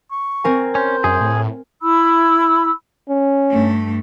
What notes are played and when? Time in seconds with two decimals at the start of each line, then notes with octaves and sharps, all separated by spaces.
0.11 C#6
0.44 C4 A#4 G#5
0.75 C#4 C5
1.04 F#2 G#4
1.21 A2
1.81 E4 B5 E6
3.09 C#4
3.50 G2 A3